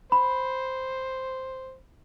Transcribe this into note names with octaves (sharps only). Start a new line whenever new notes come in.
C5 B5